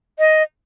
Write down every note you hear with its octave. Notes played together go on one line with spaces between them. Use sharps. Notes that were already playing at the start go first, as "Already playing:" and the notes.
D#5